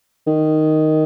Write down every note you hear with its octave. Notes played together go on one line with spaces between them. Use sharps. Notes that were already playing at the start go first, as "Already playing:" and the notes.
D#3